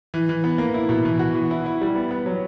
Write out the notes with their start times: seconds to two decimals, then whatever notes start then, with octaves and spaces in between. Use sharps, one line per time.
0.14 E3
0.29 E3
0.44 B3
0.58 A#3
0.74 E4
0.89 B2
1.05 E3
1.19 F#4
1.34 E3
1.51 E4
1.66 E4
1.81 G3
1.95 B3
2.11 B3
2.26 F#3